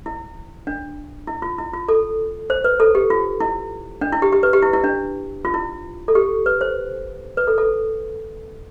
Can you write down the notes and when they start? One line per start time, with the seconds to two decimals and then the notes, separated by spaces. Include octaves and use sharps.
0.06 E4
0.67 D4
1.27 E4
1.42 F4
1.58 E4
1.73 F4
1.88 A4
2.50 C5
2.64 B4
2.80 A4
2.95 G4
3.10 F4
3.40 E4
4.01 D4
4.13 E4
4.22 G4
4.32 G4
4.43 B4
4.53 G4
4.62 E4
4.73 E4
4.84 D4
5.45 F4
5.54 E4
6.08 A4
6.15 G4
6.46 B4
6.61 C5
7.37 B4
7.47 A4
7.58 A4